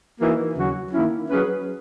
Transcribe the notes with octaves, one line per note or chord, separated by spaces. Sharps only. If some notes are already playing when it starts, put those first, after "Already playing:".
E3 A#3 D#4 F#4 A#4
D#2 C#3 F#3 C#4 F#4
D#3 A#3 C#4 E4
F#3 C#4 G#4 B4